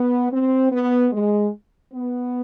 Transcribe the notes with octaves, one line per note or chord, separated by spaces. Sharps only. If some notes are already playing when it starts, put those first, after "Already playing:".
Already playing: B3
C4
B3
G#3
B3